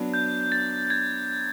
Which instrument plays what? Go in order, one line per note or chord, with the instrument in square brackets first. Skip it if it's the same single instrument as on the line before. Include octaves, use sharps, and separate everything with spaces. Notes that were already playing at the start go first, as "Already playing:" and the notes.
Already playing: [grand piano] F#3 B3 D4
[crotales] G6
A6
G#6